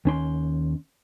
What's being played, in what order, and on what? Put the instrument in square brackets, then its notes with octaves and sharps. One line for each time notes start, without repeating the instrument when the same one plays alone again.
[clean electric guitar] D#2 C#4 C6